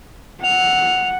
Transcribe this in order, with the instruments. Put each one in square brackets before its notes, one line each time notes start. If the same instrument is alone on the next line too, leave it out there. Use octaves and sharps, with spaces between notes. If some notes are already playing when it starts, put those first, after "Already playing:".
[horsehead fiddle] F#5 [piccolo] F7